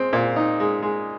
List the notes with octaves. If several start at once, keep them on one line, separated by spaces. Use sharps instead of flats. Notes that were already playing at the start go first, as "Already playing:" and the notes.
Already playing: G#3 C4
A#2
D#4
G#3
G#3